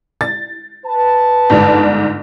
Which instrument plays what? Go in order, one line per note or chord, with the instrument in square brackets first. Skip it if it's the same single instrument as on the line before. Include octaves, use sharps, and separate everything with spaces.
[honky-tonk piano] A6
[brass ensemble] B4 A5
[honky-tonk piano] G1 G#2 D5